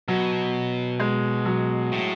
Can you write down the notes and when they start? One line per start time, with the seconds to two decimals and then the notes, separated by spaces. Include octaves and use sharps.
0.08 B2 F#3
1.00 G#3
1.46 F#3
1.92 A2